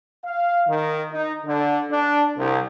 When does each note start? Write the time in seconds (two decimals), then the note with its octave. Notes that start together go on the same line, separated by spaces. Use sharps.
0.24 F5
0.67 D#3
1.12 D#4
1.45 D3
1.90 D4
2.36 C2